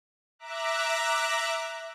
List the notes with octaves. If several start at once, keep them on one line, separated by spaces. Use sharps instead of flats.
E5 A#5 D6 F#6